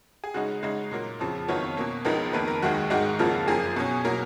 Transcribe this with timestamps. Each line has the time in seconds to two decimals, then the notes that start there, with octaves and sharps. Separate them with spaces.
0.24 G#4
0.34 C#3 G#3 D#4 F#4
0.63 C#3 G#3 D#4
0.91 A#2 F#3 A#3
1.20 F2 C#3 F3
1.48 F2 D#3 F#3 B3 F4 C#5
1.77 B2 A#3 C#4
2.05 C#2 C#3 F3 B3 D#4 A#4
2.33 F2 D#3 A#3 B4
2.47 A#4
2.62 D#2 D#3 G#3 F#4
2.90 G#2 D#3 G#3 D#4 F#4
3.19 F2 C#3 F3 A#3 F4
3.48 F#2 F3 A#3 G#4
3.76 B2 F#3 C#4
4.05 B2 F#3 A#3 A#4